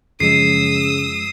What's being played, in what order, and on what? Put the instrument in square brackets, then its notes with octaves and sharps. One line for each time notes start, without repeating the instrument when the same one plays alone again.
[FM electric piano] F#2 F3 G#3 [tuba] C#3 [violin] D#6 E6 [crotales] C7